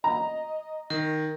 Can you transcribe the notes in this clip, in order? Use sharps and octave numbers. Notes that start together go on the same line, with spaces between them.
D#5 A#5
D#3 A#4